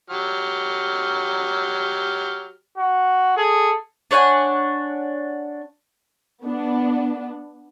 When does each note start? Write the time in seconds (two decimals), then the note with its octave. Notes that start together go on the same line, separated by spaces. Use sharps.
0.10 F#3 G4 F6
2.78 F#4
3.38 G#4 A4
4.11 D4 C#5 F#5 G#5
6.45 B3 D4